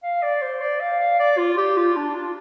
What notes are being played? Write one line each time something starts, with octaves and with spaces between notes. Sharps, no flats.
F5
D5
C5
D5
F5
F5
D5
F4
G4
F4
D4
F4